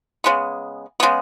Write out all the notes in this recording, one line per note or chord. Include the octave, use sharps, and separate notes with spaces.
C#3 G#3 B3
C#3 G#3 B3